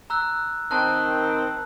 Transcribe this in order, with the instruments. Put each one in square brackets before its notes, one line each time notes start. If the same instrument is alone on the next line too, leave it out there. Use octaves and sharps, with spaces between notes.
[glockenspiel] A#5 E6 F#6
[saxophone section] D#3 C4 [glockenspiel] A5 F#6